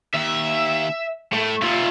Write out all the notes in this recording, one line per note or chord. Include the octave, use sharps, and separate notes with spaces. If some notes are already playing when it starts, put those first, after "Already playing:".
D#2 E5
A2 A3
A#2 F4 E5